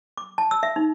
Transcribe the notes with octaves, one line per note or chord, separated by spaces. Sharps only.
D6
A5
E6
E5
D#4